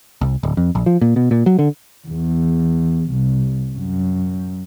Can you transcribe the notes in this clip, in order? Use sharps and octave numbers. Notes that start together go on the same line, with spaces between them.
C2
D1
F2
A#1
F3
A#2
B2
A#2
F#3
D3
E2
C2
F#2